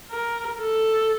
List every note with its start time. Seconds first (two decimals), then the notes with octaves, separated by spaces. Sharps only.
0.11 A#4
0.61 A4